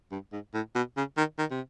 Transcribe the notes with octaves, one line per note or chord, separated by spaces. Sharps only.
G2
G#2
A2
B2
C#3
D#3
D#3
C3